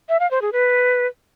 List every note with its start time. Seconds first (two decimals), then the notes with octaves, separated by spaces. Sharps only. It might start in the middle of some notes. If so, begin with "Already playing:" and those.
0.09 E5
0.20 F5
0.31 C5
0.42 G#4
0.53 B4